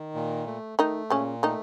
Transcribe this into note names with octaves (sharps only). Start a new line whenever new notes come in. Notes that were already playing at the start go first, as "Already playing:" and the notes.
Already playing: D#3
A#2
A3
D#3 A3 D#4
A#2 C#3 C#4
D#3 A3 D#4